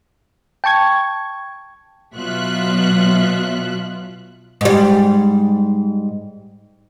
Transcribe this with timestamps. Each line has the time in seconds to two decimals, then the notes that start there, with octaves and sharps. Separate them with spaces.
0.64 G5 A5 C#6 G#6
2.15 B2 F#3 F4 E5 F#6
4.61 G#2 G3